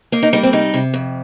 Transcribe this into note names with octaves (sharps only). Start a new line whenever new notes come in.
A#3 D#4
D#4
G3 D#4
C4
C3 D#4
C3
F2